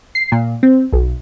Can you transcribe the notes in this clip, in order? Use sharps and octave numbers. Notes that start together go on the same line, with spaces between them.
C7
A#2
C4
B1